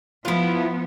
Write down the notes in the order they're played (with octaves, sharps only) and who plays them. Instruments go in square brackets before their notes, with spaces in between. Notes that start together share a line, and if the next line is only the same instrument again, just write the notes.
[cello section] F3 B3 [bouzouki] E4 F4